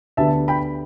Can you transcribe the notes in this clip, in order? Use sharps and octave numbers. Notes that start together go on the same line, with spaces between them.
D2 D3 B3 G4 E5 A5
G5 B5